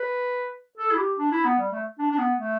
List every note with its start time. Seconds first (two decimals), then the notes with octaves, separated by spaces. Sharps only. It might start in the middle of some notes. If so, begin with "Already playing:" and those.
Already playing: B4
0.78 A4
0.92 E4
0.98 G4
1.18 D4
1.32 E4
1.44 B3
1.59 G3
1.72 A3
1.99 D4
2.11 D4
2.18 B3
2.38 A3